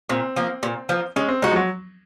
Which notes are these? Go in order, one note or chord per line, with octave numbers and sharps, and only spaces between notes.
A#2 C4
F3 A#3
A#2
F3 A#3
G#3 C#4
C4
G#3 D#4 F#4
F3
F#3